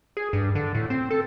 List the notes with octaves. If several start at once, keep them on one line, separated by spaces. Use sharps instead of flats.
G#4
G2
D3
A2
C4
A4